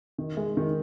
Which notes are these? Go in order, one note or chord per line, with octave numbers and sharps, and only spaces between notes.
D#3
G#3
D#3